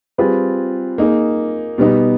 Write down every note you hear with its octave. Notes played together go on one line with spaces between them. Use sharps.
G3 C4 F4 G#4 B4
A#3 D#4 G#4
B2 G3 B3 D#4